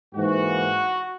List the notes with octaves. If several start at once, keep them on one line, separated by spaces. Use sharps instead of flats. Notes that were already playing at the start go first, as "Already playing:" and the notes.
G#2 E3 A#3 F#4